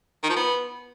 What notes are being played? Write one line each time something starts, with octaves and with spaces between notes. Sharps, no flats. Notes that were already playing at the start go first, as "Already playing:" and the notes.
D#3
F3
B3